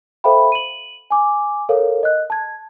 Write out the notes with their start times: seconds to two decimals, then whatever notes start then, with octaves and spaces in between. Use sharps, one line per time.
0.24 A4 C5 E5 F5 G5 B5
0.52 D#7 F#7
1.10 G#5 D6
1.69 A4 A#4 C#5 F5
2.03 D#5 F#6
2.30 A5 G#6